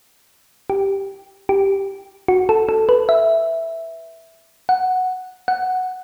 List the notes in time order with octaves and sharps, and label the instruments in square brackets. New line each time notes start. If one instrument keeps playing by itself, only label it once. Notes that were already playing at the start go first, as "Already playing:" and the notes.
[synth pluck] G4
G4
F#4
A4
A4
B4
E5
F#5
F#5